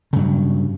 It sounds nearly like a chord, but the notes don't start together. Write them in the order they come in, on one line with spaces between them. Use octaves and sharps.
C#3 G2 F#3